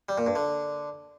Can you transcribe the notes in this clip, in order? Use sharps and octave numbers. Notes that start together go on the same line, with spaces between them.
G3
A#2
G2
D3